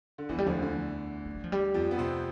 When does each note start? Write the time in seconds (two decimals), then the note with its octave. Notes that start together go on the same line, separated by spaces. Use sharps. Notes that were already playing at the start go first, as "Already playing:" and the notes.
0.18 D3
0.29 E2 E3 F3
0.38 G3
0.46 D2 D3 F3
0.62 D2 D3
1.26 A3
1.35 G3
1.44 F3
1.52 G3
1.74 F2 F3
1.91 B3
1.98 C3 C4